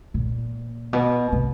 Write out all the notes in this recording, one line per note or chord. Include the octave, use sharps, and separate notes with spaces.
A#2
B2
C3